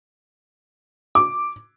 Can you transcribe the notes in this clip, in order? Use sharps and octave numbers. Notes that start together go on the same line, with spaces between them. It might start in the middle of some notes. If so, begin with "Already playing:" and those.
D6